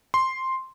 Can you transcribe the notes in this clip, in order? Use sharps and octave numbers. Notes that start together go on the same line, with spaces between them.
C6